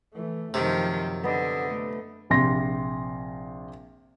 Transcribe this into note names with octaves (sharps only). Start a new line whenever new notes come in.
E3 A3
F#2 C3 D#3 F3
D3 B3 D#5
A3
A#1 C3 C6 A#6